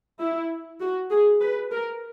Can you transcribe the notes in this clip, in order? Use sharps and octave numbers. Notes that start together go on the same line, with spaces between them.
E4
F#4
G#4
B4
A#4